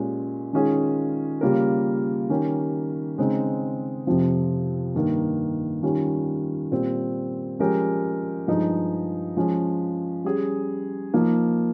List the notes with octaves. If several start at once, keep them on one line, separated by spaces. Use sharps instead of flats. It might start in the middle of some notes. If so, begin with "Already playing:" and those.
Already playing: A#2 G#3 C#4 G4
D#3 G#3 C#4 F4 G#4
C#3 G3 A#3 F4 A#4
D#3 G3 C#4 G4 A#4
C#3 G#3 C4 D#4
F2 C3 F3 C4
G2 D#3 A#3
D#3 G3 C#4 F4
A#2 G3 C4
F3 G#3 C#4 G4 A#4
G2 F3 G#3 D#4
F3 G#3 C#4
G3 C#4 G#4
F3 A#3 D#4